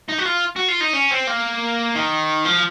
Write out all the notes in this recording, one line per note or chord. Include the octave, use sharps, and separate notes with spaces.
D#4
F#4
F4
F#4
F4
D#4
C#4
C4
A#3
D#3
F3